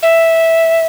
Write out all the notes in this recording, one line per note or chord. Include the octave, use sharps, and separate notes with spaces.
E5